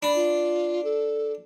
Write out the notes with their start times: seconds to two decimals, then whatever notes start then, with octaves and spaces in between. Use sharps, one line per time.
0.03 D4 B5
0.16 F4
0.84 A4